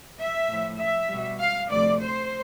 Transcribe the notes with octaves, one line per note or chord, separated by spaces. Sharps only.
E5
A2 F3 A3
E5
B2 G3
F5
D2 C3 F3 D5
C5